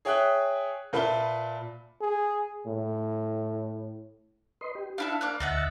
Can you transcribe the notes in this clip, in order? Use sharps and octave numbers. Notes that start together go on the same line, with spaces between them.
G#4 C#5 E5 G5 D#6 F#6
A#2 B4 E5 A5 B5 G7
G#4
A2
B4 D#5 C6
G4
D4 E4 A4 F5
A#3 D5 F#6
D2 D#5 E5 F#5 F#6 A6